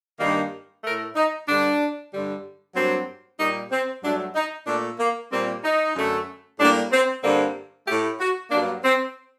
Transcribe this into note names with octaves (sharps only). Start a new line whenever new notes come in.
G2 D#3 G3 A#3
A2 A3 A#4
D#4
G2 D3 G3 D4
G2 D3 G3
G2 F#3 A#3 C4
A#2 G3 A#3 D#4
C4
G2 F#3 A3 D4
D#4
A#2 A3 D4
A#3
A#2 G3 A#3 C4
D#4
F#2 D3 A3
A2 G3 A#3 D4
C4
G2 D3 G3 A#3 C4
A2 A3 G4
F#4
G2 F#3 A#3 D4
C4